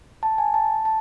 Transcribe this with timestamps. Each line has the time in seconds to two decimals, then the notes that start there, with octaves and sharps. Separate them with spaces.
0.23 A5
0.38 G#5
0.54 A5
0.85 A5